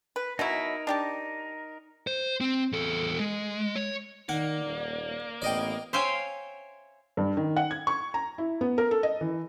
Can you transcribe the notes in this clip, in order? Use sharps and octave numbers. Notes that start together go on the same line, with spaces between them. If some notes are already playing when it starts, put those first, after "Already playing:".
B4
B2 F#3 D#4 E4 A#4
D4 G4 A5
C5
C4
E2 A4
G#3
C#5
D#3 A#3 D5 F#5
D#1
A1 B3 D5 D#5 G5
C5 C#5 E5 F5 G5 G#5
G2
D#3
F#5
G#6
C#6
A#5
E4
B3
A#4
A4
D#5
E3